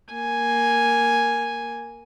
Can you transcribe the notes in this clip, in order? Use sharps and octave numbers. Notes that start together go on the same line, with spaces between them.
A#3 G#5